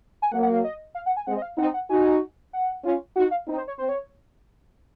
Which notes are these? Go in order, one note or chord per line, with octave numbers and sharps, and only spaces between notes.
G#5
F#3 A#3 F#5
F#5
F5
D#5
F5
F#5
G#5
G#3 C4 F#5
D#5
F5
C4 D#4 F#5
F#5
D#4 F#4 G#5
F#5
C#4 F4
D#4 F#4 F#5
F5
C4 D#4
C5
C#5
C4 C5
C#5